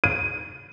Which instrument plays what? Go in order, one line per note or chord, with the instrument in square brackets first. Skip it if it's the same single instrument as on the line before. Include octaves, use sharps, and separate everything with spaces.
[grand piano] D#7